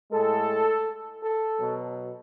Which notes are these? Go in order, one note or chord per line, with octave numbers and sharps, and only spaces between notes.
A2 G#3 A4
A4
B2 F#3